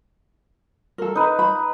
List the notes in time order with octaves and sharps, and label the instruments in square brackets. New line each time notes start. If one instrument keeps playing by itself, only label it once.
[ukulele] A4 A#4
[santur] D#4 B4
[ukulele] B5